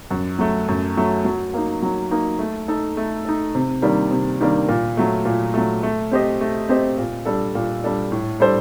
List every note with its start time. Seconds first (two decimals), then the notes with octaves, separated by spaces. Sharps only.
0.11 F#2
0.39 F#3 A3
0.68 F#2
0.97 F#3 A3
1.25 F#3
1.54 A#3 D#4
1.82 F#3
2.11 A#3 D#4
2.39 A3
2.68 D#4 A4
2.97 A3
3.25 D#4 A4
3.55 C3
3.82 D#3 G3 A#3 D4
4.11 C3
4.41 D#3 G3 A#3 D4
4.69 A#2
4.97 F#3 A3
5.25 A#2
5.54 F#3 A3
5.83 A3
6.11 C4 G4 C5 D#5
6.41 A3
6.69 C4 G4 C5 D#5
6.98 A#2
7.25 G3 D4 A4
7.55 A#2
7.84 G3 D4 A4
8.12 A2
8.40 G3 D4 A4 C5